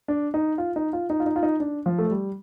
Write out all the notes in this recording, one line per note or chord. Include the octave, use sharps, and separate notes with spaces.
D4
D#4
F4
D#4
F4
D#4
F4
D#4
F4
D#4
D4
F3
A3
G3